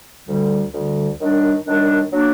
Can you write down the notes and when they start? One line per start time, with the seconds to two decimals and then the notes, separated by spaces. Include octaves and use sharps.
0.27 D2 D3 G3
0.73 D2 D3 G3
1.19 F#2 D#3 G3 D4
1.64 F#2 D#3 G3 D4
2.11 F#3 A#3 D4